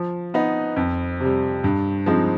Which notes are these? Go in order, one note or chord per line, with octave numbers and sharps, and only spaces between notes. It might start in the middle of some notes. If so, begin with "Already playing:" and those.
Already playing: F3
B3 D#4 B4
F2
C3 G3
G2
F3 G#3 C4 D#4